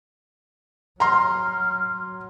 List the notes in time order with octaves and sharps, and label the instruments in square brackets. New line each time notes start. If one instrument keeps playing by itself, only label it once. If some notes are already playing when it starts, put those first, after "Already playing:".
[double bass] F#3 [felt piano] A#5 C6 [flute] F6